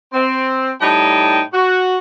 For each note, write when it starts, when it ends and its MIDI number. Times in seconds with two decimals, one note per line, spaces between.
0.13 0.71 60
0.81 1.41 45
0.81 1.41 55
0.81 1.41 63
0.81 1.41 79
0.81 1.41 81
1.53 1.97 66